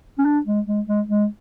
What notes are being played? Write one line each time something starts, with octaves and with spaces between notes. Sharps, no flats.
C#4
D4
G#3
G#3
G#3
G#3